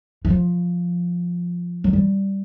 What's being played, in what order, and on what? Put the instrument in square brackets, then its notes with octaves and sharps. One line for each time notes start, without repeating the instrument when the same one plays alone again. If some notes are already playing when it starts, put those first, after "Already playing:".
[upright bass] E3
F3
F#3
G3